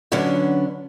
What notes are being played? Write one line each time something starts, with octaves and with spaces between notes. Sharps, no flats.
D3 F#3 B3 C#4 D4